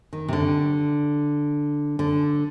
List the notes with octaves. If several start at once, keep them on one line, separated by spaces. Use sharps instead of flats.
D#3
C3
D3
D3